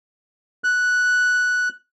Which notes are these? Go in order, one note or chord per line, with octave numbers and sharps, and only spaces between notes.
F#6